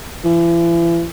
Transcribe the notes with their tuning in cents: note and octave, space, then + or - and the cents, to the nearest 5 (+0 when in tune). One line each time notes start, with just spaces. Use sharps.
E3 +40